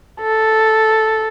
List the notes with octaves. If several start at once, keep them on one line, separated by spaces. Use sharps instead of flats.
A4